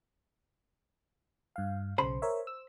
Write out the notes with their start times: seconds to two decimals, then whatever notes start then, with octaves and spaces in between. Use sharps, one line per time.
1.56 G2 F5
1.98 B1 C#3 C5 B5
2.22 A#4 C#5 E5
2.47 E6